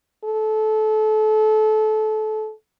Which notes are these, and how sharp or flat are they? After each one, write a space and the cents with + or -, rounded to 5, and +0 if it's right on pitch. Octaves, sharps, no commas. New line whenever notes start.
A4 -25